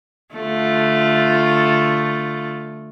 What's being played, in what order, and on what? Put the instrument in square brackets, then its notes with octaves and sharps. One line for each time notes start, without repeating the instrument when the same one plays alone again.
[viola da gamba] D3 A3 F4